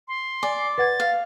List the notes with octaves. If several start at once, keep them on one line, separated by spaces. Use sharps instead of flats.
C6
D5 G#5
B4 F#5 G#6 A6
F5